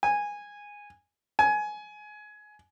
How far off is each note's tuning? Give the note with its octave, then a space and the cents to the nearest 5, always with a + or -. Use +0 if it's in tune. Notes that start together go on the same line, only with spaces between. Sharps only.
G#5 -10
G#5 +20